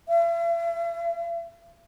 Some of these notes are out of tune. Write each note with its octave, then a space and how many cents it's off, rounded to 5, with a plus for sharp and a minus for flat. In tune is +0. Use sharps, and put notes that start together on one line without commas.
E5 +45